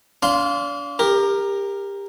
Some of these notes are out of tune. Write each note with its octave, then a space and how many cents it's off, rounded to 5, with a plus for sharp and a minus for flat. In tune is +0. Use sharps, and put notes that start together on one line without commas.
D4 -40 F5 +0 C6 +0
G4 +25 A#4 +0